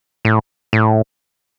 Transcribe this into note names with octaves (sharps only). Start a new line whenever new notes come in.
A2
A2